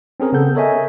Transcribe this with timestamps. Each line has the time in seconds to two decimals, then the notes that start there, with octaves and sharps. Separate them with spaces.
0.20 C4 C#4 G#4 A#4
0.33 C#3 B3 A4 G6
0.55 A4 A#4 C#5 D#5 E5 G#5